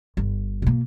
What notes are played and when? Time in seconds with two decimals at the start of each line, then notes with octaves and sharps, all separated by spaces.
0.17 G1
0.62 B2 A#3